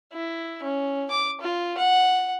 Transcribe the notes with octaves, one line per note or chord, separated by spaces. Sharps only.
E4
C#4
D6
F4
F#5